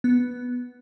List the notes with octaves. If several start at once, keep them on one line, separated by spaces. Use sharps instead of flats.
B3